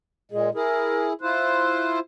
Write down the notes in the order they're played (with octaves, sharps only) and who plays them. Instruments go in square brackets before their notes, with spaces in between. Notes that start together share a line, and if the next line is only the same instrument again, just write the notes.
[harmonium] A#2 G#3 [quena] G#4
[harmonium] E4 G#4 [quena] A#4
[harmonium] E4 F4 C5 [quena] F#6